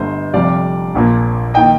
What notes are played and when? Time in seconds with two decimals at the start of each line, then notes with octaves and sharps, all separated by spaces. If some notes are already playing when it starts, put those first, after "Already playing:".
Already playing: G1 G2 D3 A3 C5 D#5
0.34 F1 F2 C3 G3 D5 F5
0.95 A#1 A#2 F3 A#3
1.54 D#3 A#3 D#5 G5